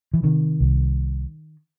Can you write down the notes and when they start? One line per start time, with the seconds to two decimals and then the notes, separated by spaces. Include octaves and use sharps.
0.14 E3
0.23 C3 D#3
0.60 C2